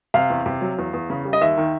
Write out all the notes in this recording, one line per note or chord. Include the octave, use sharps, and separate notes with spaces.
C3 F5
E2
C3
F#3
E2
E2
C#3
G3
D#5
D#2 E5
D#3